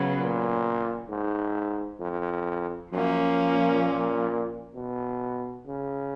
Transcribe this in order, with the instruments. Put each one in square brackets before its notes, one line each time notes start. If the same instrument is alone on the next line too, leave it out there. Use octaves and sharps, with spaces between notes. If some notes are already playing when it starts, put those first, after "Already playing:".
Already playing: [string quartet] C#3 F#3 B3
[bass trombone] A#2
G#2
F2
[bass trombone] F#2 [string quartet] F3 A#3 C#4
[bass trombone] A#2
B2
C#3